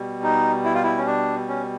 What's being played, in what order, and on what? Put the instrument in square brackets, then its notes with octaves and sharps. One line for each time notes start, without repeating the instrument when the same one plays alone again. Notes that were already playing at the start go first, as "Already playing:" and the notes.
Already playing: [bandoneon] B2 G3
D#4
E4
F4
E4
C#4
D4
C#4